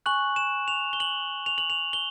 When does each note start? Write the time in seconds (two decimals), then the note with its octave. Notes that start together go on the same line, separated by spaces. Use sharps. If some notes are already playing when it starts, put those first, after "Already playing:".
0.06 G#5 C#6 F#6 F#7
0.36 E7
0.68 F7
0.93 G7
1.00 F#7
1.46 F7
1.58 F#7
1.70 F7
1.93 G7